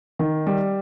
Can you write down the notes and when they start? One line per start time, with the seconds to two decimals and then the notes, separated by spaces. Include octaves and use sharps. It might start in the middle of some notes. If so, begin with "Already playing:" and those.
0.19 D#3
0.47 G3